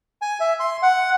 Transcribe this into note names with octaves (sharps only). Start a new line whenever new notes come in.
G#5
E5
C6
F#5